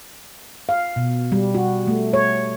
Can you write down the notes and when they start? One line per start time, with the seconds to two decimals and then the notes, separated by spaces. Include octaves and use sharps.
0.69 F5
0.96 B2
1.32 G3
1.55 F#4
1.87 A3
2.13 C#5